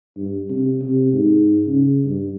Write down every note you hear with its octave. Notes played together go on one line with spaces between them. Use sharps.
G2
C3
C3
G#2
C#3
G2